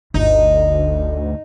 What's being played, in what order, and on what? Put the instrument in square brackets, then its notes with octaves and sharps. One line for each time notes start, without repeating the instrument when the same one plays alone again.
[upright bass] G1 [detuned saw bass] D2 [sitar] D#4